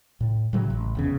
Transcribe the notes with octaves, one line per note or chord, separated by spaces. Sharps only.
A2
A2 C#3 F#3 G#3
A1
F1 E2 C#3